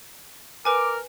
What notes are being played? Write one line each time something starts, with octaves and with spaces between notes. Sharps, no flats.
A#4 B4 G#5 D6